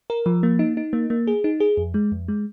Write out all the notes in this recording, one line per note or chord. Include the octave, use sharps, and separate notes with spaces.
A#4
F3
A#3
D#4
D#4
A#3
A#3
G#4
D#4
G#4
F2
G#3
F2
G#3